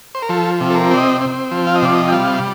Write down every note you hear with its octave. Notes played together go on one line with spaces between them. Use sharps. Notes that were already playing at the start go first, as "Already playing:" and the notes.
C5
A#4
F3 A4
C3
A4
A#4
C4 D5
D#5
C4
F3
F5
D#5
C3 D5
D#5
G5
G3 F5